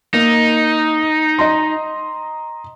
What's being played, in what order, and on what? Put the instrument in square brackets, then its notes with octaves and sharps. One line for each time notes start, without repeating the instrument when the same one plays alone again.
[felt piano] A#3 [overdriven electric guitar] D#4
[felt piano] D#5 A#5 C6